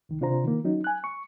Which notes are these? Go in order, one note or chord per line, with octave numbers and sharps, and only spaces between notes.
C2 D#3
C3 D4 F4 C5 A#5
D#3 A#3
F#3 C#4 D#4
G#5 F#6
C#6